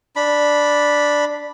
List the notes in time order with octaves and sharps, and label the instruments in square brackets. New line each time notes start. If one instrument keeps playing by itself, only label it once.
[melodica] D4 B5